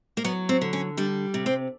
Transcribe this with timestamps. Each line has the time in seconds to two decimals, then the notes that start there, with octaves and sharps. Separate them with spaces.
0.17 A#3
0.24 F#3 B3
0.49 C4
0.61 D3
0.73 C#4
0.97 G3 D4
1.34 C3
1.46 C4